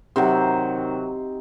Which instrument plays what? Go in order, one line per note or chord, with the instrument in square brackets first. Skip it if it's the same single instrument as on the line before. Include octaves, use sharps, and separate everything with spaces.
[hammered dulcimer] C3 D#3 F#3 C5